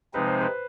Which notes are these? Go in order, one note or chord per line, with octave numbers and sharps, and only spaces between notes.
C3 F3 G#3 C4 D#4 B4
C5
B4